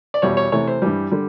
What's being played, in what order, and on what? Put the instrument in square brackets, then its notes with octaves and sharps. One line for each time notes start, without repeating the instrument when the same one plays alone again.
[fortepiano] D5
E2 B2 G3 C#5
C#5
C3 E3 A3 C#5
C5
G2 E3 G3
D3 G3